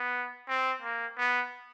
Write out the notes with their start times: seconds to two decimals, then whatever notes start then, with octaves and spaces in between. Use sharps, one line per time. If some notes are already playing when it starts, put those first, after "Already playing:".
Already playing: B3
0.48 C4
0.82 A#3
1.17 B3